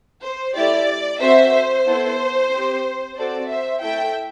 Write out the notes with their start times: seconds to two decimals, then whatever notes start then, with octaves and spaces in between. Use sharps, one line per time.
0.22 C5
0.54 A3 E4 G4 D5
1.20 C4 F#4 A4 C5 E5
1.53 C5
1.85 B3 E4 A4
2.50 C4 G4
3.16 C4 F#4 A4 D5
3.49 C5 E5
3.82 A3 E4 A4 E5 G5